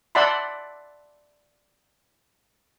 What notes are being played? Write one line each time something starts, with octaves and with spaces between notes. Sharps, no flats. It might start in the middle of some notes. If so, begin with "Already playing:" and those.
D5 E5 F#5 A5 B5 C6